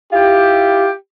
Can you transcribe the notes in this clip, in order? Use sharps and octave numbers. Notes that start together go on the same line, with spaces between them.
E4 F4 G4